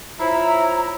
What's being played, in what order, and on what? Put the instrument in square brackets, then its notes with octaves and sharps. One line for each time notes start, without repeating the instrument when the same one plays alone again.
[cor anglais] E4 [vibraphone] F4 C5 C#5 [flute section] A#5